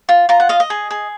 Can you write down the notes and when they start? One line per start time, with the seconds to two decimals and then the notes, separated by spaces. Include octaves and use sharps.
0.09 F4
0.29 F4 A#5
0.40 F#5
0.49 D#5 F5
0.60 D#5
0.70 G#4
0.91 G#4